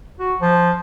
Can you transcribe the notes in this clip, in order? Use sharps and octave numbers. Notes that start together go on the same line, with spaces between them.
F#4
F3